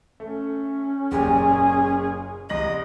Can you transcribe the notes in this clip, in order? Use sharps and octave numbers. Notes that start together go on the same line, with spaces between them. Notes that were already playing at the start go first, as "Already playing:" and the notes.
A3 C#4
F#1 A#2 G4 G#4
C2 D#5 A#6 F#7